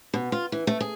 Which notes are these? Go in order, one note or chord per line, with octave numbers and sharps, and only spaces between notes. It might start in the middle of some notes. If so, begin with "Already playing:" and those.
B2
F4
E3
A3
G#4